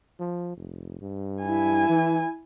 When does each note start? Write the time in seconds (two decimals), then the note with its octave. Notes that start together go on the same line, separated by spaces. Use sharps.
0.20 F3
0.57 F1
1.01 G2
1.42 E4 G#5
1.89 E3